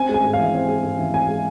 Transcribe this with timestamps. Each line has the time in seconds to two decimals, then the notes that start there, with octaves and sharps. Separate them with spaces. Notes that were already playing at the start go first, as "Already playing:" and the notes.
Already playing: C4 G#5
0.09 G#3
0.14 G#5
0.24 G#2
0.33 F5
0.39 E3
0.54 C4
0.68 G#3
0.84 G#2
0.99 E3
1.13 C4 G#5
1.28 G#3